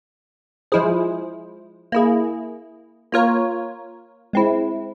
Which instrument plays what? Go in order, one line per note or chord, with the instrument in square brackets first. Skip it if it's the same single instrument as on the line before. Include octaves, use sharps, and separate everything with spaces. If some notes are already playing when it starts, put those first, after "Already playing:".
[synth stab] F3 G#3 E4 G#4 C5
A#3 E4 G#4
A#3 F4 A#4 C#5
G#3 C4 E4